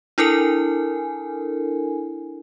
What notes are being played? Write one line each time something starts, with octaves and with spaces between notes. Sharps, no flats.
D4 E4 A4 A#4 G#5